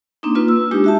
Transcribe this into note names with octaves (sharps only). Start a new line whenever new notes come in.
A#3 C4 D4 D#4
A#3 F4 B4
E6
G#3 D4 D#4 G4
F#4 E5 A5